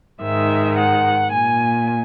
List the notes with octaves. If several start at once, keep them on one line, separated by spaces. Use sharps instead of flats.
G#2 D#3 G#3 E5
F#5
A#2 G#5